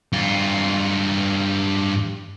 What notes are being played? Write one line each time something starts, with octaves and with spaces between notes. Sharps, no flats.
G2 F4